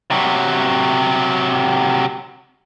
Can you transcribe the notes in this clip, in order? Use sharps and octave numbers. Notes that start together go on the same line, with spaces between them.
C3 F#3